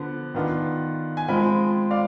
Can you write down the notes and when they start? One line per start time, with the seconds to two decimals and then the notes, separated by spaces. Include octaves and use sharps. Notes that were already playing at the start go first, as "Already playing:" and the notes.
Already playing: D3 F3 B3
0.34 D#3 B3 D4 F4
1.17 G#5
1.28 F3 G#3 C4 F4 G5 B5
1.91 D5 F5